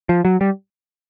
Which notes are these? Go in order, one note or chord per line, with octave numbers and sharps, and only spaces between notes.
F3
F#3
G3